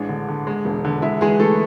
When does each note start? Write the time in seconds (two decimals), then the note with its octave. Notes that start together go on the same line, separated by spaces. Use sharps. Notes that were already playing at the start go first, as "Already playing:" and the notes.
Already playing: A1 G#3 D4
0.09 D3
0.28 D3
0.47 G#3
0.65 E1
0.85 D3
1.02 G#3 E4
1.21 E3 G#3 G#4
1.40 E3 A3 A4